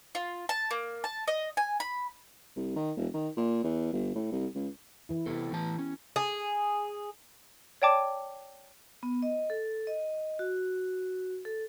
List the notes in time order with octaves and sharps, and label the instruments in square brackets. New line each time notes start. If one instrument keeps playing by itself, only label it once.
[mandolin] F4
A5
A#3
A5
D#5
G#5
B5
[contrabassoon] C2
D#3
E1
D#3
A#2
E2
G1
A2
C2
C#2
[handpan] E3 E4
[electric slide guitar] C3 E4 A4 [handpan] B3 G4
[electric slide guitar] A2 E3 A5
C#4
[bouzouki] G#4
[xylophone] C#5 D5 G5 A5 D6
[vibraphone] B3
D#5
A4
D#5
F#4
A4